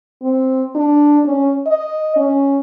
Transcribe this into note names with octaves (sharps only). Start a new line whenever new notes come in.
C4
D4
C#4
D#5
C#4